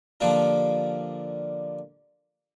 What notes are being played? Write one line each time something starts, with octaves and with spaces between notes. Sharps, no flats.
D3 F3 G3 A#3 D4